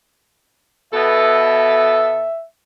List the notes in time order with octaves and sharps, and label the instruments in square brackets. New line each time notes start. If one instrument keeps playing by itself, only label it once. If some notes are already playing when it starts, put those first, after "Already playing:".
[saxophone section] B2 B3 A4 [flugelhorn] E5